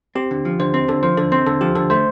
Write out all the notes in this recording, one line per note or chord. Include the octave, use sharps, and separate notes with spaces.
C4 G4
D3
F3
D3 C5
C4 C5
D3 A4
F3 C5
D3 A4
C4 C5
D3 A4
F3 G4
D3 A4
A3 C5